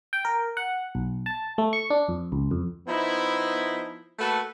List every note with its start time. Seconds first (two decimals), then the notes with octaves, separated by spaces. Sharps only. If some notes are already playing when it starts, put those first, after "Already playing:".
0.13 G5
0.25 A#4
0.57 F#5
0.95 B1
1.26 A5
1.58 A3
1.73 C#6
1.90 D4
2.09 F2
2.32 C#2
2.51 F2
2.87 F3 B3 D#4 E4
4.19 A3 A#3 F#4 A4 B4